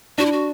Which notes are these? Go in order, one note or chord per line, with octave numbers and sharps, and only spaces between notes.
D4 F#4
E4
F#4